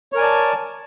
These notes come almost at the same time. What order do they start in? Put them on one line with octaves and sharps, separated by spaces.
C#5 A#4 G#5 D5 A5